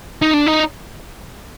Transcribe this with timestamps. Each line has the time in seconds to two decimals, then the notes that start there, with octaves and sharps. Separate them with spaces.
0.22 D#4
0.34 D4
0.46 D#4